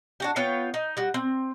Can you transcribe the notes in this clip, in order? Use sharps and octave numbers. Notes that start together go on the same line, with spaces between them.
D4 F#4 G4
B3 F4 C#5 G5
D#4
G3 F#4
C4